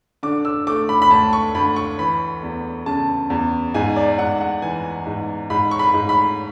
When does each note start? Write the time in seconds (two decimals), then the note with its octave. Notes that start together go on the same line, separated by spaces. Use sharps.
0.23 D3 D6
0.45 E6
0.67 A3 D6
0.89 B5
1.02 B5
1.11 D2 A5
1.33 C#6
1.55 D2 B5
1.76 C#6
1.99 E3 B5
2.43 E2
2.86 C#3 A5
3.30 E2
3.74 G#2 G#5
3.96 D5
4.19 G#2 F#5
4.41 F#5
4.62 E3 G#5
5.06 G#2
5.50 G#2 B5
5.71 C#6
5.79 B5
5.94 G#2
6.09 B5